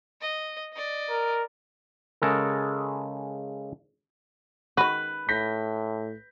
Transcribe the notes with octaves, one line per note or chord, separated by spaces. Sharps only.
D#5
D5 D#5
A#4
C#3 G#3 A4 A#4
D#3 F#4 B4
A2 G6 A#6 B6